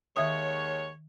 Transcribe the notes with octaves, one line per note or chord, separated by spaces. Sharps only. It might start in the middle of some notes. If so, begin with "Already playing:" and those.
D#2 D#3 G#3 C#5 E5 D#6